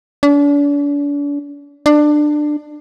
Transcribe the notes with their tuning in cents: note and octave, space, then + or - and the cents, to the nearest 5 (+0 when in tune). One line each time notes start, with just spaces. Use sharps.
D4 -40
D4 +20